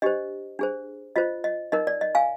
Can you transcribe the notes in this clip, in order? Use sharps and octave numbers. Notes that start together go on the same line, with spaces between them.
D4 G4 C5 D#5
D4 G#4 C5
F4 C5 D#5
D#5
D#4 A#4 D#5
D5
D#5
F5 G#5